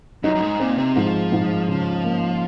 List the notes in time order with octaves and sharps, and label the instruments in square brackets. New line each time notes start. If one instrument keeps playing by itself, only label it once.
[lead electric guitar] F#2 [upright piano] D#4
[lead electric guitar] F#2
G#2
[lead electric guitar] A#2 [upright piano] C4
[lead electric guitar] C3
[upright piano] G#2 [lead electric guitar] F3
[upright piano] G#2
C#3
A#3